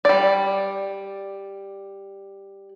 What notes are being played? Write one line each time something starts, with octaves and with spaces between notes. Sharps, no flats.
G3 D5